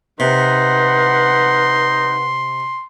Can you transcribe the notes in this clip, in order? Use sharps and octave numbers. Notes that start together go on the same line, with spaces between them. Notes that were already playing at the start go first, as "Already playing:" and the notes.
C3 D#4 B4 F#5 C6